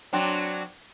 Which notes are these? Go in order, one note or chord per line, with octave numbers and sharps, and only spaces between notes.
F#3 C4 D4